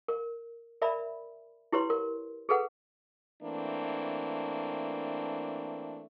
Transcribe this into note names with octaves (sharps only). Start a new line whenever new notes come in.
A#4
A#4 D5 E5 A#5 B5
E4 G4 B4 C#5 C6
A#4
G#4 A4 B4 F#5
E3 A3 A#3 C4 D4